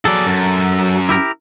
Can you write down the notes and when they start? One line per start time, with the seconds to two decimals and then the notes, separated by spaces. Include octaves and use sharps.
0.05 F#3 G#4 A4 D5
0.26 F#2
1.09 E4 G4 A#4